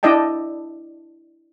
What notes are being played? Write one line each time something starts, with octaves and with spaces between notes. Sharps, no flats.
D4 E4 D5 D#5 G5 A5